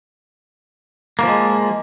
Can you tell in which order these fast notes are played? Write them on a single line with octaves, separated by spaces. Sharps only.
A#3 F3 G#3